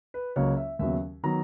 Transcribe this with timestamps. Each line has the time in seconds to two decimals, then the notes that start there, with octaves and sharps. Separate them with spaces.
0.14 B4
0.36 C#2 C#3 F#3 A#3 C#5
0.57 E5
0.79 D#2 C#3 F#3 B3 E5
1.23 D#3 F#3 B3 A#5